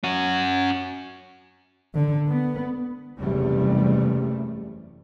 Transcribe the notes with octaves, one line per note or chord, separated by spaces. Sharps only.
C#4 F#4
D3
B3
F#1 E2 C3 G3 A3